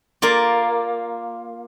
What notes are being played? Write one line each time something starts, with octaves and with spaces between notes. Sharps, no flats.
A#3 F4 D5